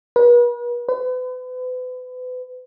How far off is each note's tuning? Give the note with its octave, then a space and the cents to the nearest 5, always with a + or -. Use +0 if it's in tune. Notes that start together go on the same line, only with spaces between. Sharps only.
B4 -40
B4 +35